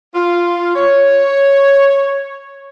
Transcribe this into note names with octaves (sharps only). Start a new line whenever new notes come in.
F4
C#5